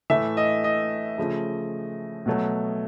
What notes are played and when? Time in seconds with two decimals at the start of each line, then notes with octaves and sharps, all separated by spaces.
0.10 A2 E3 A3 E5
0.37 D#5
0.64 D#5
1.18 C#3 F3 A3
2.26 B2 F#3 A3